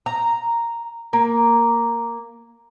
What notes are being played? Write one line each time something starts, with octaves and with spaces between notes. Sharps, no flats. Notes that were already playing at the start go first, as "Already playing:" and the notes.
A#5
A#3